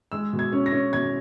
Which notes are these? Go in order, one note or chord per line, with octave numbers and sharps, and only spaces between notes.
G#3 E6
B2
G#6
C#4
A#6
C#4
B2 G#6